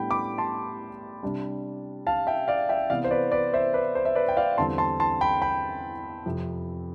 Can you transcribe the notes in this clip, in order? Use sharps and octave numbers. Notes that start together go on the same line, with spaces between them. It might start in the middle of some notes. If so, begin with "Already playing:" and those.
Already playing: A2 G3 B3 D4 G5 B5
B5 D6
A5 C6
C3 G3 D4
F5 A5
E5 G5
D5 F5
E5 G5
C3 E3 B3 D5 F5
C5
B4 D5
B4 D5
C5 E5
B4 D5
C5
E5
B4 D5
G5
D5 F5
E2 D3 G3 C4 A5 C6
A5 C6
A5 C6
G5 B5
G5 B5
F2 C3 F3